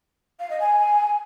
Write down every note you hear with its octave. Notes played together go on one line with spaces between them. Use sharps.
F5
D#5
G#5